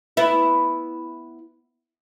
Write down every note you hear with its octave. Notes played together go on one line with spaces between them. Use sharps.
B3 E4